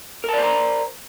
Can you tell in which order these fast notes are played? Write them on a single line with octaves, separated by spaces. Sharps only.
A#4 A5 D5 C5 A#5